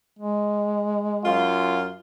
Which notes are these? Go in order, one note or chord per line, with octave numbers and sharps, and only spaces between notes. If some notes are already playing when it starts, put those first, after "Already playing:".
G#3
F#2 F4